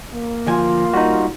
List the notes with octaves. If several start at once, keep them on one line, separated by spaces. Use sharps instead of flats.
A#3
D2 F3 F4 G#5
G3 D#4 F#4